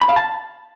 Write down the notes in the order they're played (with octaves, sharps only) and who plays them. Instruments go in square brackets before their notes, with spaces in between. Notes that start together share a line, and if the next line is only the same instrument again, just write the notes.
[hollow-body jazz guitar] B5
F5
A5